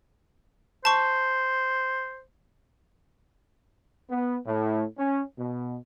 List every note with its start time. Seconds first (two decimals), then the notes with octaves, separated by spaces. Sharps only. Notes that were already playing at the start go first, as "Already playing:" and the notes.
0.85 C5 A5 C#6
4.10 B3
4.45 A2
4.98 C#4
5.38 B2